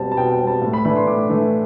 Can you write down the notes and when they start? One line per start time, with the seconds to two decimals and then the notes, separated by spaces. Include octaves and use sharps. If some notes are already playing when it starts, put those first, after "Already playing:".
Already playing: B2 G3 C4 A5
0.12 A5
0.17 B2 G5
0.32 G5
0.39 G3 C4
0.47 A5
0.62 A2
0.73 B5
0.85 E3 A3 D4 B5
0.96 C6
1.07 A2 D6
1.29 E3 A3 D4